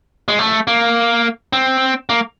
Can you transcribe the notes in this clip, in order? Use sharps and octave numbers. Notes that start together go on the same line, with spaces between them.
G#3
A3
A#3
C4
A#3